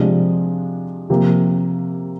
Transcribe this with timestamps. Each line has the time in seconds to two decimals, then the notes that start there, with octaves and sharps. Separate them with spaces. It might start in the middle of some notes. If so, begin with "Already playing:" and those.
Already playing: C3 F3 G#3 D4
1.10 C3 F3 A#3